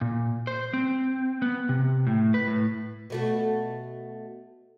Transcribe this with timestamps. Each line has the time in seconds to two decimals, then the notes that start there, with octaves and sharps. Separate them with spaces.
0.01 A#2
0.47 C5
0.74 C4
1.42 B3
1.69 C3
2.07 A2
2.34 B4
2.47 A2
3.10 B2 A3 F#4